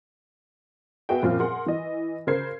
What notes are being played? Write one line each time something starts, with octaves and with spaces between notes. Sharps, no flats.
B3 F#4 G#4 E5 G5
F#2 A#2 F3 C4 F4
G#4 A#4 F#5 C6
E3 D#5
C#3 A#4 C5 G#6 C7